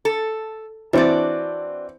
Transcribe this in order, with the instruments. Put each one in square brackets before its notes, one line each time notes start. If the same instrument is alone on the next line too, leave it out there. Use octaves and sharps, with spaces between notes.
[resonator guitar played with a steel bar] A4
[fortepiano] E3 C4 [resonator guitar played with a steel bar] D4 F#4 D5